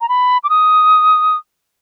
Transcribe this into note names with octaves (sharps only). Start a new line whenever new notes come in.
A#5
B5
D6
D#6